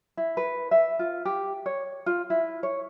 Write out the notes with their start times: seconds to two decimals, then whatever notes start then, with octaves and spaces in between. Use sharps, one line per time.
0.17 E4
0.37 B4
0.71 E5
0.99 F4
1.25 G4
1.66 C#5
2.06 F4
2.30 E4
2.63 C#5